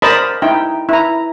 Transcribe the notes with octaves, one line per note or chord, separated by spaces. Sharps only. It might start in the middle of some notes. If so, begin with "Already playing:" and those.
A#4 C5 D5 D#5 A5 B5
D#4 E4 G5
E4 A#5